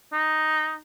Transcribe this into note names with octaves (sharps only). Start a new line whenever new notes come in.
D#4